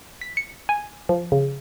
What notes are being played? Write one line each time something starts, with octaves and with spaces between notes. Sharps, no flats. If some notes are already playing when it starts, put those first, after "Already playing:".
B6
C#7
G#5
F3
C#3